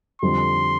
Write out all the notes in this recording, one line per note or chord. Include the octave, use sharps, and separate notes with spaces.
F2 D3 G3 C4 C6